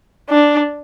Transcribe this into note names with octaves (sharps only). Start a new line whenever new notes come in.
D4